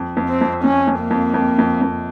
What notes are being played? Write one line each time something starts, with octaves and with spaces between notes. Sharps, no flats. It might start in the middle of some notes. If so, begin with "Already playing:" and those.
Already playing: F2
F2
C4
F2
F2 C#4
F2
A#3
F2
F2
F2
F2